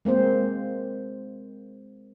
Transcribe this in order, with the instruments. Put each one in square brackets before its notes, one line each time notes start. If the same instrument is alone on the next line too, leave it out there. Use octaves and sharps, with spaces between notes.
[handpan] G#3 A#3 C4 C5